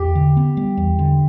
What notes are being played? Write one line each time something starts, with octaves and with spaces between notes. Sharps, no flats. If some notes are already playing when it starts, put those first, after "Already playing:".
Already playing: E2 G4
D3
B3
G3
E2
D3